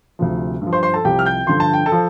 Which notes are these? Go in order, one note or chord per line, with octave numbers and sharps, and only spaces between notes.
D2 C3 F3
G2
F3
C5 C6
C5 C6
A4 A5
C2 C3 F3 G4 G5
F6
G5 G6
G2 D3 F3 C6
A5
G5
A4 A5
F3